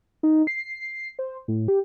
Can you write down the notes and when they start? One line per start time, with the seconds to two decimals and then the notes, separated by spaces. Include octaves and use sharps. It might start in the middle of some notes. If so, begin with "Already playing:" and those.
0.23 D#4
0.47 C7
1.19 C5
1.48 A2
1.68 G4